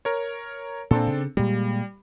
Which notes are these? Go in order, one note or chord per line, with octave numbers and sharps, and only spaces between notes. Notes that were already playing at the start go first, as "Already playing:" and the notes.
A#4 C#5
A#2 C4 D4 A4
C#3
A#2 G3 G#3